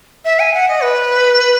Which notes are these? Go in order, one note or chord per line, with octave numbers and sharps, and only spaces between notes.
E5
G#5
F#5
D#5
B4